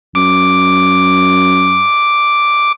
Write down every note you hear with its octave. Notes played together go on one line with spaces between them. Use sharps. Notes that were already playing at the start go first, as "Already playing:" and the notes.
F#2 D6